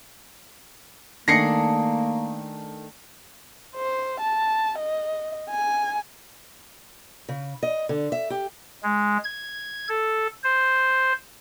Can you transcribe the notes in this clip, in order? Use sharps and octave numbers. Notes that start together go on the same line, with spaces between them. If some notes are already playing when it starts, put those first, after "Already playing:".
D#3 A3 A#3 D4 G#4 A#6 C7 C#7
C5
A5
D#5
G#5
C#3
D#5
D3
E5
G4
G#3
G#6
A4
C5